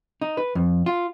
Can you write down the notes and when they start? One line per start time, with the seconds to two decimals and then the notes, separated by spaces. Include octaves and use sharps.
0.21 D#4
0.37 B4
0.55 F2
0.86 F4